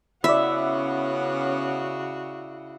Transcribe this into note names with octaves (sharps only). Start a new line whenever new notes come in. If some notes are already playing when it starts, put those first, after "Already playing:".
C#3 B3 C#4 E4 F#4 D5 E5